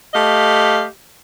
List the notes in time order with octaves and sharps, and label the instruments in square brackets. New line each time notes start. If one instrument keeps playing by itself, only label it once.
[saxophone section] A3 G4 D#5 F5